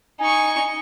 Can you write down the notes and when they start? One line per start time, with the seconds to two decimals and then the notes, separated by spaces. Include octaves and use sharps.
0.20 D#4 G#5 C#6